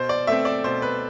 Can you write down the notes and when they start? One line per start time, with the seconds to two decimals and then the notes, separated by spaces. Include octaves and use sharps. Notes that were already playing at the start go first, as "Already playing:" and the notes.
Already playing: B2 C5
0.09 D5
0.27 A3 C4 E5
0.45 D5
0.64 B2 C5
0.82 B4